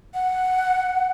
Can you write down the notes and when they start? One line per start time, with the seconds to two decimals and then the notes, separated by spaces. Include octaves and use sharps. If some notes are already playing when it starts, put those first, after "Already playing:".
0.14 F#5